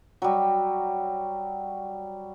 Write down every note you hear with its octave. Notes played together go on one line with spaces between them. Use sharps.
F#3 G3